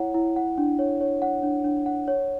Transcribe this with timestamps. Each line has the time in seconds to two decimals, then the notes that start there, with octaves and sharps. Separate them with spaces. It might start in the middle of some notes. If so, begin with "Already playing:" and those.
Already playing: E4 C#5 F#5
0.14 E4
0.36 F#5
0.58 D4
0.79 C#5
1.01 C#5
1.22 F#5
1.43 D4
1.64 D4
1.86 F#5
2.08 C#5